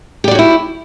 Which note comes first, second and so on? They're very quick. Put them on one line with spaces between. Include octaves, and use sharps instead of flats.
G4 D5 F#4 C#5 E4